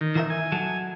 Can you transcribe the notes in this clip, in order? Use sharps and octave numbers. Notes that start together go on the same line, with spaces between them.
D#3
E3 A#4 E5
G#5
F#3 A4